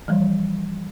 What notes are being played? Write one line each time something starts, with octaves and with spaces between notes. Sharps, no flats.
E3 F3 G3